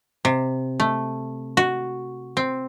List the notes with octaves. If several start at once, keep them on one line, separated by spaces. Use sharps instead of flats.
C3
A3
F#4
C4